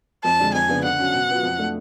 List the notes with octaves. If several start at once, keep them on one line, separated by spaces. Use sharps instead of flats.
F2 A5
D3 G#3 D4
F2 G#5
C#3 F3 B3 D4
D3 F#5
F#3 C#4
B2
F#3 B3 F4
F2
F3 A3 D4